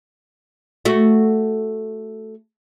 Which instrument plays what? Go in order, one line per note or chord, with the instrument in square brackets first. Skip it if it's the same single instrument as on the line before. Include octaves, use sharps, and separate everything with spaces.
[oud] A3 F#4